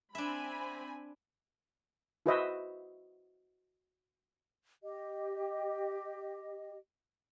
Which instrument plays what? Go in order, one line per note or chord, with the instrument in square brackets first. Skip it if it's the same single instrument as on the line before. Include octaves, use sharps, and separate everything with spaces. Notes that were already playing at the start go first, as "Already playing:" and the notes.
[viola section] C4 G#5 B5 [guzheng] D4 E5
[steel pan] E4 F#4 B4 C5 D#5 E5
[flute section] G4 D#5